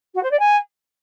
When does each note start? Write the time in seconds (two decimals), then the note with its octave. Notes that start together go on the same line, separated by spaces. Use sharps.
0.14 F#4
0.23 C5
0.31 D5
0.39 G#5